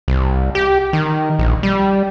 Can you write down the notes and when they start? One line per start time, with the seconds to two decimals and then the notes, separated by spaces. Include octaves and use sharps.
0.08 C2
0.55 G4
0.93 D#3
1.39 A#1
1.63 G3